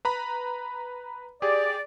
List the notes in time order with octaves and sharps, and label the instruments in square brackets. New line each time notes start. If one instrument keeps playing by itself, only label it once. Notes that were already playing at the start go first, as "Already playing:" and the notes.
[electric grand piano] B4 A#5 B5
[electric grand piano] G4 G#4 [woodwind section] D5